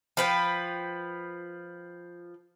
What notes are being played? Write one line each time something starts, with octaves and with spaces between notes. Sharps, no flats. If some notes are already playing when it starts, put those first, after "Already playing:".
F3 B4 G5